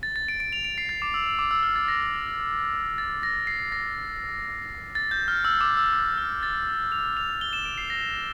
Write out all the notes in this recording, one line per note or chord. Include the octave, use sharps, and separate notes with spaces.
A6
A6
D7
D7
F7
D7
C7
A6
D6
E6
E6
D6
E6
F6
A6
A#6
A#6
A6
A#6
C7
A#6
A6
G6
F6
E6
D6
E6
D6
F6
A6
F7
F7
G7
E7
D7
C7
A#6